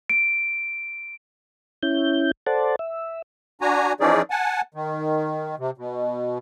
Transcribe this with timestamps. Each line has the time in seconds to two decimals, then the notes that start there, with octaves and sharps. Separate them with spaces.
0.10 D7
1.83 C#4 E4 G6
2.47 A4 C5 D5 F#5 A5
2.79 E5
3.61 D4 F#4 G#5 A#5
4.00 E3 F3 C#4 D#4 G#4 D5
4.30 F#5 G#5 A5
4.74 D#3
5.59 C3
5.78 B2